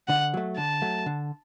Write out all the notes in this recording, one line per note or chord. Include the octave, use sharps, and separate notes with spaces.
D3 F#5
F#3 A3
D3 A5
F#3 A3
D3